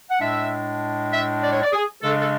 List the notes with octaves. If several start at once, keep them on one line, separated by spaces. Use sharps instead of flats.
F#5
A2 G#3 D4 E5
E5
D5
C#5
D5
G#4
C#3 G#3 D4 A4
A4